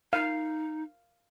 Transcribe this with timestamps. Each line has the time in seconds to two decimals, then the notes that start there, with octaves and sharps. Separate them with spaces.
0.13 D#4 F5